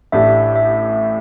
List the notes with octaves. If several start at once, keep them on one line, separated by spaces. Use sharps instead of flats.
A1 A2 A3 D4 G4 E5
E5